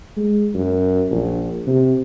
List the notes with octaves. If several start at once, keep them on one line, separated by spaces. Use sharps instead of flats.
G#3
F#2
A#1
C3